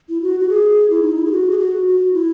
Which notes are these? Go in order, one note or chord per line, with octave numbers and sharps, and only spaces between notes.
E4
F#4
F#4
G#4
E4
D#4
E4
G#4
F#4
G#4
F#4
F#4
E4